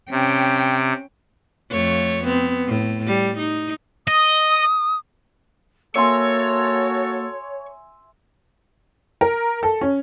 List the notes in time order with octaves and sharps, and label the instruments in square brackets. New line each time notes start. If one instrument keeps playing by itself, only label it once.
[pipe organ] C3 [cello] C#4 G5
[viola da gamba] F2 A3 C#5
B3 C4
A2
G3
D#4
[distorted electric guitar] D#5 [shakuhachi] D#6
[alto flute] A#3 [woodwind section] F#4 A4 [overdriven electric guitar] C#5 [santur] E5 G#5 C6
[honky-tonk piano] A#4
A4
C#4